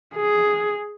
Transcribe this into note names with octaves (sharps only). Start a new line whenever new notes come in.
G#4